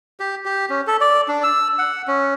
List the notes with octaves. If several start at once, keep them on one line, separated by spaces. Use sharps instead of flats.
G4
G4
C#4
A4
D5
D4
E6
F#5
C#4